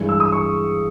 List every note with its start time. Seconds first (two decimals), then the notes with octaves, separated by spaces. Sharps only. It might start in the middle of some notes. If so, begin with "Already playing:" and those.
Already playing: G2 E3 G#3
0.09 E6
0.20 D#6
0.32 C#6